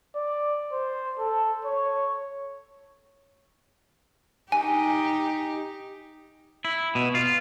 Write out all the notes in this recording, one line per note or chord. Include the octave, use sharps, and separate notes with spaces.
D5
C5
A4
C#5
D#4 G4 G#5
E4
B2
F4